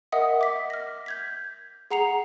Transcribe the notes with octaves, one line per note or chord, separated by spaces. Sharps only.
A#4 D#5 E5 F#5 D#6
D6 B6
F6 A#6
G6 G#6 B6
G#4 F#5 A#5 C7 C#7 F7